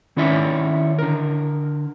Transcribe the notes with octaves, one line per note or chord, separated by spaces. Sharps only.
D#3 C#4 E4 C#5 D5 E5
D3 A#4